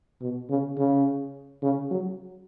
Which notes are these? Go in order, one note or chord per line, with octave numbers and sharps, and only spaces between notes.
B2
C#3
C#3
C#3
F#3